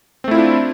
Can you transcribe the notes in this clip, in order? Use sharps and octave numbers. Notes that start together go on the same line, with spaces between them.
A3 C4 D4 E4 F4